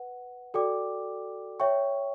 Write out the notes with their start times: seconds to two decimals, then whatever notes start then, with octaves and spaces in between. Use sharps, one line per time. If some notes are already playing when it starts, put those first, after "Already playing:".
Already playing: B4 F#5
0.54 F#4 A4 D5 G5 D6
1.60 C#5 E5 G5 C#6